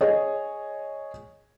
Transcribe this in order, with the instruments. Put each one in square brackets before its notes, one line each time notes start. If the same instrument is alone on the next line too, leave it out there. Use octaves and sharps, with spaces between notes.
[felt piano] G#4 C#5 D#5